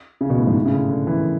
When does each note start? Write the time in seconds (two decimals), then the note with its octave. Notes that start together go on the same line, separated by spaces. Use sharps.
0.21 C#3
0.30 B2
0.38 A2
0.47 G#2
0.56 A2
0.65 C#3
0.73 D3
0.90 D3
1.07 E3